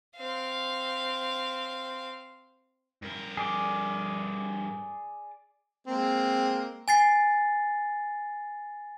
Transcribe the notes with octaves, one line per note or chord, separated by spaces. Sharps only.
C4 F5
G2 A#4
G#4 D5 D6
G#3 A#3 C4
G#5 A6 C7